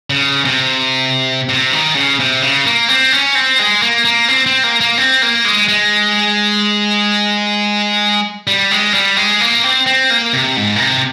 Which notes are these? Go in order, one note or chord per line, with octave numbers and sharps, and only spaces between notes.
C#3
C3
C3
D#3
C#3
C3
C#3
A#3
C4
C#4
C4
G#3
A#3
A#3
C4
C4
A#3
A#3
C4
A#3
G#3
G#3
G3
G#3
G3
G#3
A#3
C4
C4
A#3
C3
G#2
A#2
C3